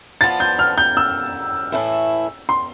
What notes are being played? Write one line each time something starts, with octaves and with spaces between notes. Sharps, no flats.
F3 B3 D4 F4 A6
G6
F6
G6
E6
A2 E3 A3 E4
C6